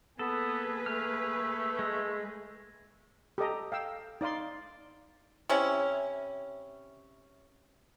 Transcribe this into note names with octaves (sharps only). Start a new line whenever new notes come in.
A#3 B3 G#4 A4 B4
A3 F6
G#3
G4 A4 D#5 A#5
F5 G5 E6
D#4 D5 F5 C6
C3 C#4 E4